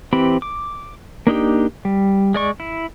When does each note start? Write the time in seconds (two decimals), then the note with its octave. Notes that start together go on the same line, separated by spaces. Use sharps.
0.13 E3 C4 G4 B5
0.42 D6
1.27 A#3 D4 D#4 G4
1.85 G3
2.34 G#3 D5 C#6
2.60 E4